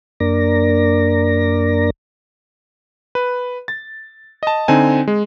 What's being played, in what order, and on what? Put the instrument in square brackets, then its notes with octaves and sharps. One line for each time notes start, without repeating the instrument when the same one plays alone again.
[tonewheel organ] F#2 A#3 D4 A#4 D5 A#6
[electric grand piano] B4
A6
D#5 A5
D3 C4 D#4 G#5
G#3